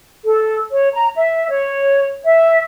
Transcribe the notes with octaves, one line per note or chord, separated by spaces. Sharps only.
A4
C#5
A#5
E5
C#5
E5